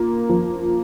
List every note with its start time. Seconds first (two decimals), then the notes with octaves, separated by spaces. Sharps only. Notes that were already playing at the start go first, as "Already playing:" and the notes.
Already playing: A#3 F4
0.29 F3